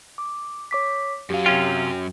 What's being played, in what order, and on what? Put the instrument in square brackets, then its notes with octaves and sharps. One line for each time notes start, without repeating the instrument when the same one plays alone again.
[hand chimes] D6
C#5 D6 B6
[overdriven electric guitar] F#2 F#3 [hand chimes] G4 F5
[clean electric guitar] C3 C#4 F4 [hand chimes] G5